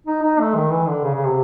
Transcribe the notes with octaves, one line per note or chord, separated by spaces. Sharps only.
D#4
D#4
A3
D#3
E3
D3
C#3
C#3
C3